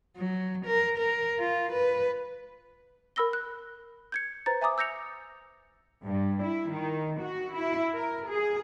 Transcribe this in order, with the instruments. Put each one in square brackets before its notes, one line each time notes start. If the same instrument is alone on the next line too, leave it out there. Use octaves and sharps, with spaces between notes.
[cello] F#3
A#4
A#4
F4
B4
[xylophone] A#4 B5 E6 A#6 G7
F#6
G6 G#6 C#7
B4 C5 A#5 A6
E5 G#5 A#5 D6 D#6
E6 G6 A#6 C#7 F7
[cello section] G2
E4
D#3
F#4
E4
A#4
G#4